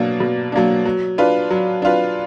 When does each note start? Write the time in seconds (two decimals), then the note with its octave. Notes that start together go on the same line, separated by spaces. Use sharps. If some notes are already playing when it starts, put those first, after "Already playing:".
Already playing: B2 F#3 A#3 D4
0.20 B2
0.52 F#3 A#3 D4
0.85 F#3
1.18 D4 F4 B4
1.50 F#3
1.82 D4 F4 B4